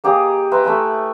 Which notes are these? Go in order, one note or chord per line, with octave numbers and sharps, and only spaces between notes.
A#3 G4 G#4 D#5
B4 E5 A#5 C6
A3 E4 B5 E6